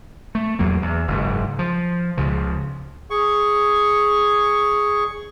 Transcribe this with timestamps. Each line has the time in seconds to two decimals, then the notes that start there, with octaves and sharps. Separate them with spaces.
0.35 A3
0.59 E2 F#3 A#3
0.82 E2
1.08 F#1 G#2 C#3
1.59 F3
2.18 C#2 C#3 F3
3.10 G#4 C#6